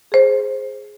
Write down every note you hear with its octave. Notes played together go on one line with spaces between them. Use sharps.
G#4 C5